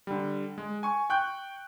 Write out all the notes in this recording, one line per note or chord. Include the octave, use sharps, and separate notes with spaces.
D3 G3
G#3
G#5 C#6
G5 C#6 F#6 G6